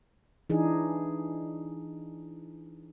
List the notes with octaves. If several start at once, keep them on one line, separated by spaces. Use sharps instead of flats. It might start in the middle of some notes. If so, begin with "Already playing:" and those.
E3 D4 D#4 G#4